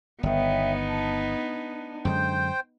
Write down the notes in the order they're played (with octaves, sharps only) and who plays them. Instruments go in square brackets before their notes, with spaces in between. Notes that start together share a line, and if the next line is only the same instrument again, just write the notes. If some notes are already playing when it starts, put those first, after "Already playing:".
[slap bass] G1 D#3 [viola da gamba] B3 D#4 [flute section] C#5 E5 G5
[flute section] A5
D4
[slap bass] F#2 D3 G#3 [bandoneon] C5 G5